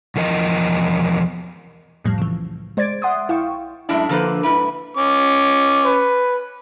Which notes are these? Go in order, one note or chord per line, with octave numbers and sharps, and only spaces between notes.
E2 F3 A#4 D#5
C2 F2 A2 F3 G3
C#3 E3
G#3 C5 D5 G#6 A6 D7
E5 F#5 C6 D#6
A#1 E4 F5 G5 C#6
F#2 A2 G#3 D4 E4
D3 F3 A#3 A4 B4 C5
G#2 E4 B4
C#4 D6
B4